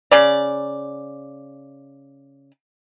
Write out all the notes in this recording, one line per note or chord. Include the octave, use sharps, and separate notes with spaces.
C#3 D5